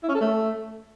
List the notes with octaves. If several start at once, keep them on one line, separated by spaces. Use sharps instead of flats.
E4
C#4
A4
A3